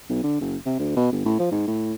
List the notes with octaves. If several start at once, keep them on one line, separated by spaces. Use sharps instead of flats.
B1
D3
F#1
C3
D2
B2
G1
A2
F3
G#2
A2